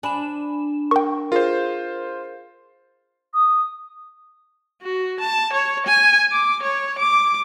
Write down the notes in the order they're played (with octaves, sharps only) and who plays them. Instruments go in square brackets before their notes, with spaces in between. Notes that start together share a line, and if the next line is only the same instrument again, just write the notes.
[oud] D4 [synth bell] G#5 B5 E7
[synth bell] A#4 [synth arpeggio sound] G5 C#6
[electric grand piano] F4 C5 [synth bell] G#4 A#4
[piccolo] D#6
[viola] F#4
A5
C#5
G#5
D6
C#5
D6